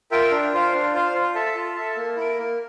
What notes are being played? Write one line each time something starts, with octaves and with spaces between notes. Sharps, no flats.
F4 A#4 E5 G5
D4
F4 C5 F5
D4
F4 C5 F5
F4
A4 E5 A5
F4
A4 E5 A5
A#3
E4 A#4
A#3